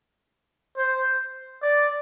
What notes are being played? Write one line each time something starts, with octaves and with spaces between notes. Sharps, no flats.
C5
D5